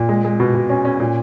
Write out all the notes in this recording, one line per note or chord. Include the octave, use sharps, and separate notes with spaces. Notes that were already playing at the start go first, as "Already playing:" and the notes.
Already playing: A#2
G#3
G#3
B2
B2
C#4
C#4
A#2